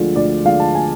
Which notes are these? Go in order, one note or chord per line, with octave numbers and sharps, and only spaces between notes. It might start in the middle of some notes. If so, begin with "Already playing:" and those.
Already playing: D2 D3 F3 G#3 F4
D2 D5
D3 F3 G#3 F5
A5
G#5